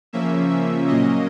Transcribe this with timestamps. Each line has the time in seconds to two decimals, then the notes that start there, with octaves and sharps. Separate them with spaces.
0.13 C#3 F3 A#3 C#4 E5
0.50 E5
0.87 A#2 F#3 A#3 C#4 D#5